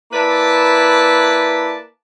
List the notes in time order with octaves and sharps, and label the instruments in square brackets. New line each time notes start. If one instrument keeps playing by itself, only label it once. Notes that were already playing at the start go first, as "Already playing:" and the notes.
[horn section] A#3 E4 B4 D5 A5